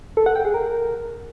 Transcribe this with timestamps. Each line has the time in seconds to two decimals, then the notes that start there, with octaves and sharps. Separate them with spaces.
0.17 A4
0.26 F#5
0.36 G5
0.45 G#4
0.54 A#4